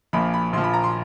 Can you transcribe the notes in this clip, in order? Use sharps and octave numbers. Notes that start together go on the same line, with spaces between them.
A#1 A#2 F3 B5
B5
A#1 A#2 F3 C6
B5
A#5
C6